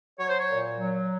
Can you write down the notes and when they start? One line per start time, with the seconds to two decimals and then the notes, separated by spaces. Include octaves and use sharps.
0.19 F#3 C#5
0.29 C5
0.39 C#5
0.48 A#2
0.76 F#3